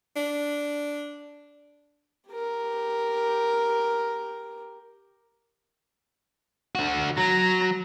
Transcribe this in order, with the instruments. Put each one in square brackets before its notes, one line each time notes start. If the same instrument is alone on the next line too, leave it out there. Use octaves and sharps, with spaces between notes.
[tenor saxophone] D4
[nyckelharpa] G4 A#4
[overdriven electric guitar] D3 F#4
[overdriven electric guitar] F#3 [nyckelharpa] A#5